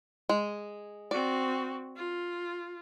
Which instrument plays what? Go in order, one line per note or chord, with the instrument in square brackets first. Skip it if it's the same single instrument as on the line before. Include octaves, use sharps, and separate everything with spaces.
[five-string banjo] G#3
[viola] C4 F#4 [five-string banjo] D5
[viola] F4